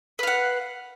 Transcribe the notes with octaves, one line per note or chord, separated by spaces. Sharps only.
B4 F5 F#5